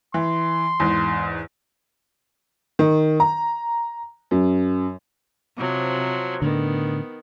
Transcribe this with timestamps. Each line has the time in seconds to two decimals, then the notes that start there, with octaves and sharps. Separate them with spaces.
0.14 E3 C6
0.80 E2 G#2
2.79 D#3
3.20 A#5
4.31 F#2
5.58 C3 F3 F#3
6.42 A2 D3 D#3 B3